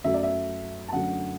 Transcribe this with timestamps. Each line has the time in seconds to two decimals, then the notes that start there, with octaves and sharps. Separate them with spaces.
0.04 F#2 F#3 A3 E5
0.14 D5
0.23 E5
0.88 A5
0.93 F#2 D3 F#3 A3 F#5